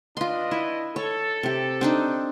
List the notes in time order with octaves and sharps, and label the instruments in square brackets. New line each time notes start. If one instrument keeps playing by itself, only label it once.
[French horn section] D4 B4 D#5 [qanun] F4 C6
[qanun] E4
[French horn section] A4 [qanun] C#5
[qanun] C3 G4
C4 D4 D#4